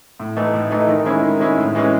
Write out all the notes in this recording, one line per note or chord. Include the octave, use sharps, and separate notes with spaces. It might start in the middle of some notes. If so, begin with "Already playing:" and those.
A2
E3 A3 D#4
A2
E3 A3 D#4
D#3
G#3 C#4 E4
D#3
G#3 C#4 E4
A2
E3 G#3 C#4